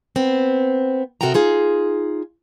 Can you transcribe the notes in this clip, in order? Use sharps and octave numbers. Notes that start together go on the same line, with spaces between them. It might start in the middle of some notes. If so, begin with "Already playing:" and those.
B3 C4
C3 F#4 A4 A#4 G5 A#5
D#4 F4 G#4